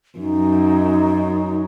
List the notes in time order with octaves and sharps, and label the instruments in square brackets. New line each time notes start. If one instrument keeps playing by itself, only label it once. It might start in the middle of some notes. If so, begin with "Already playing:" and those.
[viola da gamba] F#2 [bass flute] D#4